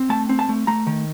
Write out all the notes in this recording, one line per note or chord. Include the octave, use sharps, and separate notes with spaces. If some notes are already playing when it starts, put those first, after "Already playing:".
Already playing: C4
A3 A5
C4
A5
A3
A3 A#5
D#3